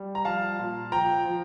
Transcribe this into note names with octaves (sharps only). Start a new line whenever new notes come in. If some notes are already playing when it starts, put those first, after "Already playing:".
Already playing: G3
A#5
F3 F5 A5
A#2
F3 G5 A#5
F3